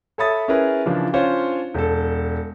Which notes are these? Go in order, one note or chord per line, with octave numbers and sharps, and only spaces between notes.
A4 C#5 E5 B5 D#6 A6
C#4 E4 G#4 A#4 B4
C#3 E3 F3 D4
C#4 D4 F4 C5 C#5
E1 A4